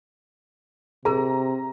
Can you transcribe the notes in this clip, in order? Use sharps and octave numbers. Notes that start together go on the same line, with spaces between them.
C3 G#4 A#4 A#5